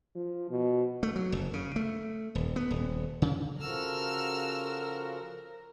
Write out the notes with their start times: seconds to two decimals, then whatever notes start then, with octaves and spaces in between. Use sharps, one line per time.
0.15 F3
0.50 B2
1.03 A3
1.16 F#3
1.32 F#1
1.53 C#3
1.76 A3
2.35 D#1
2.56 B3
2.71 D#1
3.22 C#3
3.61 C#3 F3 F#4 A4 A#4 E6 F6